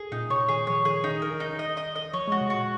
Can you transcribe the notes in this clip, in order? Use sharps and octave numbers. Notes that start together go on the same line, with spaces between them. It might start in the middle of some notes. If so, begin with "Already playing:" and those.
Already playing: G#4
A#2 D#4
C3 C#5
D#3 G#4
F3 C#5
D#3 G#4
D#4
A#4
D#4
D#5
D#5
D#5
F3 C#5
G#3
F#4
C3
A#2 F#4